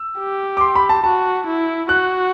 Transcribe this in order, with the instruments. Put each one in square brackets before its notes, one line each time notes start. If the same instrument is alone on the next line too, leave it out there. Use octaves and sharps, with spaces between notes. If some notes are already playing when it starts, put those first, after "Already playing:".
Already playing: [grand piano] E6
[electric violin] G4
[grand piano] D6
C6
B5
A5
[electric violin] F#4 [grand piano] A5
[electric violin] E4
[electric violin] F#4 [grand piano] F#6